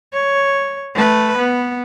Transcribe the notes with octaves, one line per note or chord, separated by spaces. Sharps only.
C#5
A3 B4
B3